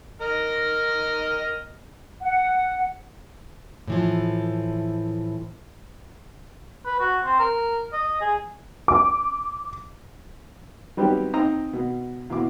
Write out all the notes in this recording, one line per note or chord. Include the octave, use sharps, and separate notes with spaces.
A#4 D#5 F6
F#5
A2 E3 F3
B4
F#4
C4
A#4
D#5
G#4
D6
F#3 G3 B3 C4 D#4 G4
C4 D#4 A#5 D#6
B2
E2 B2 E3 D6